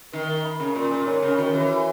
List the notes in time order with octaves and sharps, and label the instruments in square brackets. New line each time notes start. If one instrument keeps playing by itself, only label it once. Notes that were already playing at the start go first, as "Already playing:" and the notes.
[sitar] D#3 [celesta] A#4
[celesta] E5
B5
[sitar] C#3 [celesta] A#4
[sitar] A#2 [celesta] A#4
[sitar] A#2 [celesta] A#4
[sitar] G#2 [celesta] C#5
[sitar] C#3 [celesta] C#5
[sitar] D#3 [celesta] F#4
[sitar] E3 [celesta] C#5
[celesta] F#4